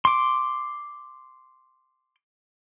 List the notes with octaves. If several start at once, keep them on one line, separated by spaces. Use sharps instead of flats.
C6 D6